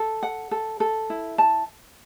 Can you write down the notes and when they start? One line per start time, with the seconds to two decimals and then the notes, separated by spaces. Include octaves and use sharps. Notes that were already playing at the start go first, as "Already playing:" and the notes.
Already playing: A4
0.23 F#5
0.51 A4
0.80 A4
1.10 E4
1.38 A5